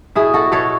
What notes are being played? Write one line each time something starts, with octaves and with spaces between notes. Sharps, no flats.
B2 E4 G#4
F#4 A4
B2 A4 C#5